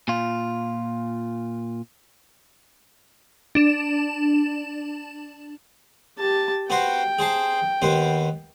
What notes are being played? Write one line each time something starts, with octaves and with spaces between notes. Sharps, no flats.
A#2 F4
D4 E7
G4 A5
B3 F#4 C5 G5
G#4 C5 A5
D#2 B3 C5